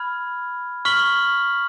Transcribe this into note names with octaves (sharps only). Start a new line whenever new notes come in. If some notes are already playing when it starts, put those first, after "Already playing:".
Already playing: B5 F6 G#6
C#6 F6 B6 F#7